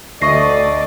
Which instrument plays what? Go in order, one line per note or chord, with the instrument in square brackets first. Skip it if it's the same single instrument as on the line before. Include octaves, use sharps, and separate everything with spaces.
[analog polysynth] D2 D#5 [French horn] A3 [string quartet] D5 [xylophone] C#6 A#6 C7